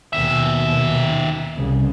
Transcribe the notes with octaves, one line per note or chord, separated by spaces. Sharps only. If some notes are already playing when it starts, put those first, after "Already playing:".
D#2 B2 D#3 E5
C2 C#3